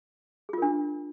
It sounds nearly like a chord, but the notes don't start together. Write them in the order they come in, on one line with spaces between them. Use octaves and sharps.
G#4 F4 A#4 D4